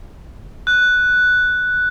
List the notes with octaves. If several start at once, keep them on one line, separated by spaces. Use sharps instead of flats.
F#6